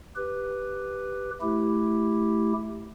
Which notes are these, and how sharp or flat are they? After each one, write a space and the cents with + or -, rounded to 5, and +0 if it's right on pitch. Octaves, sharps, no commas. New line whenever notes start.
G4 +0 B4 +0
A3 -15 E4 +0 G4 +0